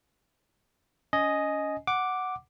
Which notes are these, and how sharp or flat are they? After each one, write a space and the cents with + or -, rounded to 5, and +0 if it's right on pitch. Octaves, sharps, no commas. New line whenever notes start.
C#4 +30 D#5 +0 G#5 +10
F#5 +0 D6 +0